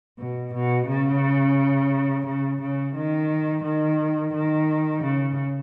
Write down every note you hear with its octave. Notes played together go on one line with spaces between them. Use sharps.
B2
B2
C#3
C#3
C#3
D#3
D#3
D#3
C#3